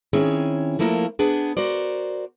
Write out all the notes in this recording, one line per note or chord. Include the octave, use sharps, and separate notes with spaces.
D#3 C4 C#4 E4 G#4 C#5
F3 A3 A#3 E4 F4 A#4
B3 D4 G#4
F#4 A#4 C5 D5